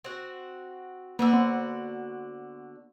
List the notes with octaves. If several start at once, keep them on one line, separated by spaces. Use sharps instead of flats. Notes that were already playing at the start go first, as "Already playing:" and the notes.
C4 F#4
D3 A#3 D4 F#4 E6
B3